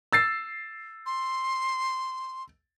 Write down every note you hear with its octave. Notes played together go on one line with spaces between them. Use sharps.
E6 A6 C7
C6